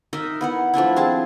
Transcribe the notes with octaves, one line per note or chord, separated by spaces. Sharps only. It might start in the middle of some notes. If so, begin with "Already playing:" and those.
D#4 A#4 D#5 E5
B3 E4 F#5
F3 A3 D4 E4
C4 G#4 A5